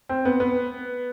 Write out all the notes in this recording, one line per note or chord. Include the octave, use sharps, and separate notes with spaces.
C4
B3
B3